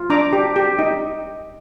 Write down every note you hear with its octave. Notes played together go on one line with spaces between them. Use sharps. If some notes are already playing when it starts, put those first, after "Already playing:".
Already playing: F4
D4 A#5 D6
G4
G4
D#4